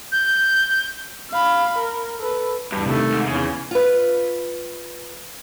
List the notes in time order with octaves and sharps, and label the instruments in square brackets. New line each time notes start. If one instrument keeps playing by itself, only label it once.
[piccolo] G6
[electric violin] F5 B5
A#4
A4 B4
[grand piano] E2 A5 [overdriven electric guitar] G2
[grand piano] C3 D#3 [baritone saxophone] A3
[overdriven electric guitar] G#2
[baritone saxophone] E2 [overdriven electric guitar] C#3
[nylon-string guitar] F4 B4